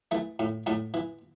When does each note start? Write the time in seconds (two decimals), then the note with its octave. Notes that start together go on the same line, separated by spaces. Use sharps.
0.11 E3 A3
0.39 A2
0.66 A2 A3
0.94 E3